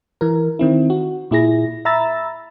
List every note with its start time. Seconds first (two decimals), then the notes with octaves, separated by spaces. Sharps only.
0.21 E3 A#4
0.59 D#3 C4 E4
0.90 F#4
1.31 A#2 E4 G#4 A#6
1.85 E5 A#5 B5 E6 A6